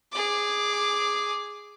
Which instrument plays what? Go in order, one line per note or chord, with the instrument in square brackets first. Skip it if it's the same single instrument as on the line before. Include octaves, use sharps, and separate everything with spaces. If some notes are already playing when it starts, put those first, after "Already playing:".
[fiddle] G#4 D6